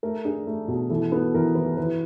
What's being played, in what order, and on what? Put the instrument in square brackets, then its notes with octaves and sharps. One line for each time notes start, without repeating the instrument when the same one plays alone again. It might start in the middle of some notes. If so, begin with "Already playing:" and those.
[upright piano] A3 A#4
D4 G#4
A3
B2
E3 A4
B3 A4
E3 A#4
E3 B4
E3 B4